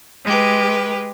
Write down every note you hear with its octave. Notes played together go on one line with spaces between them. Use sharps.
G#3 G4 B4